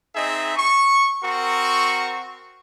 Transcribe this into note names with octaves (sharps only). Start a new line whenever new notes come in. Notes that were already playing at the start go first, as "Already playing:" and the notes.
C4 D#4 G#4 D#5 E5
C#6
C4 F#4 A#4 C#6